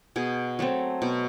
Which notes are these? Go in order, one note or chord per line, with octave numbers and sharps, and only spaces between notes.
B2 G#4
F#3 A3 C4
B2